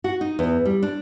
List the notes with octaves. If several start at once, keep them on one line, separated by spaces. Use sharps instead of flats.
F#4
D#4
E2
G3
D4